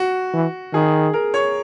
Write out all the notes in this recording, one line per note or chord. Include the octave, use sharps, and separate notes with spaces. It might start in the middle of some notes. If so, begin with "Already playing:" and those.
Already playing: F#4
E3
D#3 G#4
A#4
C#5